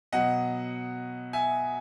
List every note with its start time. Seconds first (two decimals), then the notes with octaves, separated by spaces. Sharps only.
0.12 B2 F#3 D#5 F#5
1.33 E5 G#5